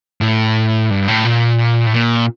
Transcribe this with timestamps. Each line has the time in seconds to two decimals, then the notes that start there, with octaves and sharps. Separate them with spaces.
0.21 A2
0.90 G2
1.08 A2
1.25 A#2
1.86 A2
1.94 A#2